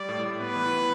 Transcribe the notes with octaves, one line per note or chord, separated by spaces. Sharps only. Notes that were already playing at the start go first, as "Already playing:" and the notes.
Already playing: G3 D5
A2
A2
B3 B4
E3
E3